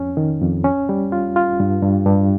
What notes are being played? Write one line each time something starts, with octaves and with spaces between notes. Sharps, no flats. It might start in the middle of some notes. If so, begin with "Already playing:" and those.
Already playing: F2 C#4
D#3
F2
C#4
G3
F4
F4
G2
G2
G2